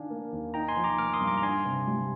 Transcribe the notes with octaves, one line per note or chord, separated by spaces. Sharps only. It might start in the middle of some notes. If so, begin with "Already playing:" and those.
Already playing: D#3 D4 F5 G#5
A#3
D#2
D#4 G5 A#5
G#5 C6
F3
A#5 D6
A#3 D6 F6
C6 D#6
G2
A#5 D6
A#5
D4 G#5 C6
C3
G3